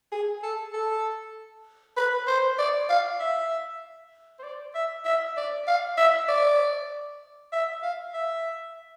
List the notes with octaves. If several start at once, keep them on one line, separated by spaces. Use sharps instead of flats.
G#4
A4
A4
B4
C5
D5
F5
E5
C5
D5
E5
E5
D5
F5
E5
D5
E5
F5
E5